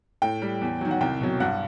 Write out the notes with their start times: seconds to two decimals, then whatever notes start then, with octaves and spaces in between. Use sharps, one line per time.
0.22 A2 G5
0.42 G3
0.61 E2
0.81 D#3 F#3
0.91 F#5
1.01 C2 G5
1.21 B2 F#3
1.40 G2 F#5